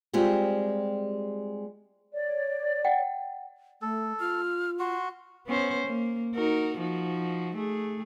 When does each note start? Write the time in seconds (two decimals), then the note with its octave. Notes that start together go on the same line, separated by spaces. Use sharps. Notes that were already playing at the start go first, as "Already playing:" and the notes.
0.13 G3 G#3 C4 F4 G4
2.13 C#5 D5
2.85 F#5 G5
3.82 A3 A4
4.20 F4 F6
4.79 F#4 C6
5.47 B3 C#4 C5
5.87 A#3
6.36 D#4 F#4 A#4
6.78 F3 D#4 F#4
7.56 A3 G#4